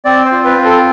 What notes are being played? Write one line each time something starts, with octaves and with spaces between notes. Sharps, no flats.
C4 D5
C5
F4
B4
C4
A4